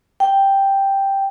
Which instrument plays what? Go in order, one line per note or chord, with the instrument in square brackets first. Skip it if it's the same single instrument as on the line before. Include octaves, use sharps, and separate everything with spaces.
[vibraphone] G5